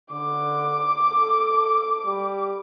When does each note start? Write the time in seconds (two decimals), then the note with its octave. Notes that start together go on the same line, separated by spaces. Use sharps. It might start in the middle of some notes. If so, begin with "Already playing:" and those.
0.11 D3 D6
1.12 A4
2.05 G3